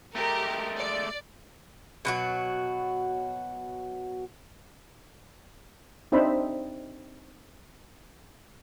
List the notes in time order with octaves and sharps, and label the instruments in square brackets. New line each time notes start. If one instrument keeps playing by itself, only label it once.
[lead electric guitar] G#3 A3 [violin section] G4 A#4
[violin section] D5
[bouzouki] B2 F#3 F#4
[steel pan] C4 D4 D#4 C5 E5 B5